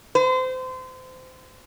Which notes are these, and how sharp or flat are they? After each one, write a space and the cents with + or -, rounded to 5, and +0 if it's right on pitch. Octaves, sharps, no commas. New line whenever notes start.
C5 -30